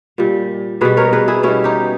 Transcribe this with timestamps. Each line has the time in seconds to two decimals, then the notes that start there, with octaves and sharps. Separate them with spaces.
0.18 A#2 G3
0.81 B2 G3 G#4 B4
0.97 A#4 C#5
1.13 G#4 B4
1.28 E4 G#4
1.43 B2 G3 C#4 E4
1.64 D#4 G4